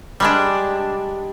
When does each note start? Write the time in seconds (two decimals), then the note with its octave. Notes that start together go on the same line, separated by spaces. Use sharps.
0.20 G3 G#3 D4